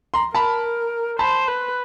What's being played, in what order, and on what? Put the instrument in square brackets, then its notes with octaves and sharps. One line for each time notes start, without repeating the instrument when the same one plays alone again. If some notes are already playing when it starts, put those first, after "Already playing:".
[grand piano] A#5 C6
[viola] A#4 [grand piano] A5 B5
[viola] C5 [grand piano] A5 B5
[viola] B4